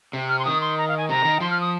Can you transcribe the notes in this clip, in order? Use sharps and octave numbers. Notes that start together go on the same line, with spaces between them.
C3
F6
C6
D#3 D#6
C6
A#5
F5
G#5
C3 A#5
D#3
F3 C6
F6
D#6